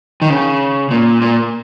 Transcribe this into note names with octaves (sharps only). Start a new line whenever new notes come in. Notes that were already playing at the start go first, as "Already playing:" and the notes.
D#3
C#3
A#2
A#2